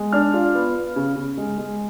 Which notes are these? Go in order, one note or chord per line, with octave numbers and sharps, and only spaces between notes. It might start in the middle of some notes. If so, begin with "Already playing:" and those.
Already playing: G#3
D4 F6
F4
B3
B3
C#3
C#3
G#3
G#3